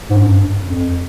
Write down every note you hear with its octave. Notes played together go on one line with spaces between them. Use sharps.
G#2
G2
F#2
G2
F#2
F2